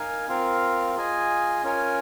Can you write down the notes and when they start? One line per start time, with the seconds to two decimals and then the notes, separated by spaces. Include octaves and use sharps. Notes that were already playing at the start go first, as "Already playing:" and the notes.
Already playing: D#4 A#4 F5 G#5
0.28 C4 F4 A#4 F5
0.95 F4 G#4 D#5 G#5
1.63 C#4 F4 A#4 C#5 G#5